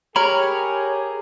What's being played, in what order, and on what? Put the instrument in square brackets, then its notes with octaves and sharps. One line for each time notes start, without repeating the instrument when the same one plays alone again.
[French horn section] G4 G#4 [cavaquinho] A#4 [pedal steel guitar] C#5 A#5 B5